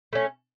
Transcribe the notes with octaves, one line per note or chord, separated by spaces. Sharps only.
A3 C#4